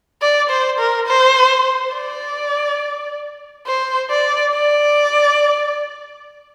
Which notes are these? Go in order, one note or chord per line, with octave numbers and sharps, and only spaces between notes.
D5
C5
A#4
C5
D5
C5
D5
D5